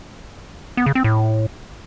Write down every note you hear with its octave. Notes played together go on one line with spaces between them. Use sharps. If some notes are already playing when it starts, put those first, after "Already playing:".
B3
C#3
C4
A2